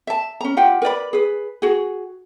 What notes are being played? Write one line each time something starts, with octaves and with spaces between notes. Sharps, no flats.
E5 A5
C#4 A#5
F4 G4 F#5 G5
A#4 B4 D5 B5
G#4 B4
F#4 G#4